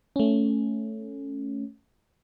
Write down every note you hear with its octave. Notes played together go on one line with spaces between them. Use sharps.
A3 C#4